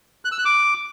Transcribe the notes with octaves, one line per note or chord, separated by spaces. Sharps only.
F#6
E6
F#6
D6